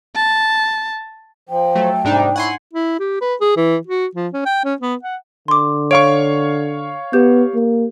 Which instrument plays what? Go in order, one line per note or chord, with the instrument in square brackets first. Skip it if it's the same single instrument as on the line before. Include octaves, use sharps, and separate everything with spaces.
[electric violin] A5
[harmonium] F3 [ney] G5
[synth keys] F#3 A3
[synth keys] G#2 D4 D#4 [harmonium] C3 G3
[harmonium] E4 C#5 [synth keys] F#5 G#5 C6
[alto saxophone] E4
G4
B4
G#4
E3
F#4
F3
C#4
G5
C#4
B3
F#5
[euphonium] D3 [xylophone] C6 D6
[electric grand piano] C#5 F5 C#6 [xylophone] D7
[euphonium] B3 [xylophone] G4 G6
[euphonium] A#3